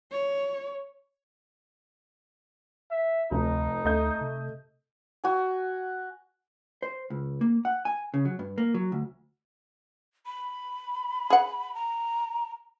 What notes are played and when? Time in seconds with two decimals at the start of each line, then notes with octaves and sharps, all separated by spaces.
0.11 C#5
2.91 E5
3.31 F1 D2 D#4
3.85 D2 A3 D#5 G6
4.21 C3
5.24 F#4 G#5
6.82 C5
7.10 C#2
7.41 A#3
7.65 F#5
7.85 G#5
8.14 C#3
8.25 F#3
8.39 G2
8.58 A#3
8.74 F#3
8.92 D2
10.26 B5
11.30 G#4 F#5
11.74 A#5